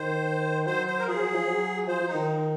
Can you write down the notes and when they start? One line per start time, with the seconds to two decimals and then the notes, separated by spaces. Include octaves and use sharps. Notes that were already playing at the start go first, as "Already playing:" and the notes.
Already playing: D#3 C5
0.67 F#3 C5
0.87 C5
0.99 A#4
1.07 F3 G#4
1.21 F#3
1.35 F3
1.48 F#3
1.88 F3 C5
2.01 F3
2.08 D#4
2.15 D#3